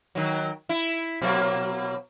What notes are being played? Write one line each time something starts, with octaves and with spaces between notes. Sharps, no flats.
D#3 F#3
E4
B2 F#3 A#3